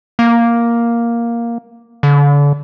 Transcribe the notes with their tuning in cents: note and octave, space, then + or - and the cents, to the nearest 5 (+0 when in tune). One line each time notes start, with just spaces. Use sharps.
A#3 +5
D3 -35